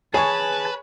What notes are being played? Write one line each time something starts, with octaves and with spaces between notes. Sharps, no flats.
G#4 B4 C#5 G#5 A5 C#6